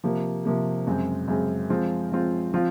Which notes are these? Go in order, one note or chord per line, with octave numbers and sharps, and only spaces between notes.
C3 F3 A#3
C3 F3 A#3
F#2 C#3 G#3 C4
F#2 C#3 G#3 C4
F3 G#3 C4 F4
F3 G#3 C4 F4
F3 C4 F4